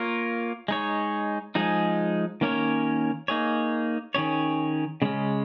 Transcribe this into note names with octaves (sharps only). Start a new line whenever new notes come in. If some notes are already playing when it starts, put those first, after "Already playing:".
Already playing: A#3 F4 A#4 C#5
G#3 D#4 C#5
F3 G#3 D#4 G#4
D#3 A#3 C#4 A#4 C#5
A#3 D#4 G#4 C#5
D#3 C#4 G#4 C#5
C#3 G#3 C#4